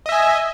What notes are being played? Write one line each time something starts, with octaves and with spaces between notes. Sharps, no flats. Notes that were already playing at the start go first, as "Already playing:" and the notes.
D#5 E5 G#5